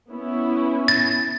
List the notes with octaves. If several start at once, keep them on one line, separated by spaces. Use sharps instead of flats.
B3 C#4 E4
A6